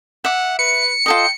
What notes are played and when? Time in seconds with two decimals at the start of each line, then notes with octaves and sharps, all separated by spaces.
0.25 E5 F#5 D6
0.59 B4 C#7
1.06 F4 A4 D#5 G5